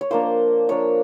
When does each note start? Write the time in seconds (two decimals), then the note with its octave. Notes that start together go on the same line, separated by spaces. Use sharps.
0.01 C#5
0.11 F3 A#3 D4 C5
0.69 F3 A#3 D4 C#5